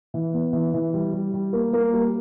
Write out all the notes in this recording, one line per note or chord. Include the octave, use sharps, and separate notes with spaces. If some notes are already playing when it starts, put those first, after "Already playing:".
E3
B3
E3
E3
G3
G3
G3
A#3
A#3
G3